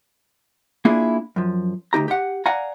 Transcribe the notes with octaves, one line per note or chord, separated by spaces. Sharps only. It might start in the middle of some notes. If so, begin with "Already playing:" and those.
A#3 D4 E4 F4 G#4
F#2 F3
D2 D#4 G4 A#5
G4 F#5
D5 F5 F#5 G#5 A#5